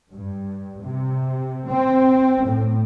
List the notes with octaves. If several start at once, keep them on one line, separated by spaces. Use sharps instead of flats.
G2
C3
C4
A2